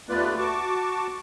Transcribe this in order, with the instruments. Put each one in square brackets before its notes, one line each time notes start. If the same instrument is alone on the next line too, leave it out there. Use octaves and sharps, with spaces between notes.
[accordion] D#2 A3 B3 F4 B4 D5
F#4 A5 C#6 D6